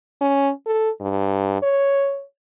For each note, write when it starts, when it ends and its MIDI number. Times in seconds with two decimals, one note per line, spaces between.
0.21 0.51 61
0.66 0.90 69
1.01 1.57 43
1.62 2.24 73